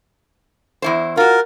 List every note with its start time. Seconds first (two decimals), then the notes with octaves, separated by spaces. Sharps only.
0.82 E2 E4 C5
1.17 F4 F#4 A#4